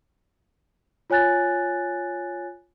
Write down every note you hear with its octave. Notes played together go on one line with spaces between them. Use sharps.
F4 C#5 G#5 F#6 A6